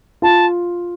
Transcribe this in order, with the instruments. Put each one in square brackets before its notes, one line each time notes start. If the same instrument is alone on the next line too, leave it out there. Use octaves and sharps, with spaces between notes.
[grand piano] F4 [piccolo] A5